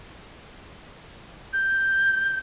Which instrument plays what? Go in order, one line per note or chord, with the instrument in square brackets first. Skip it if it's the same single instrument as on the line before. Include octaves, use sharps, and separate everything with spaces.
[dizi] G6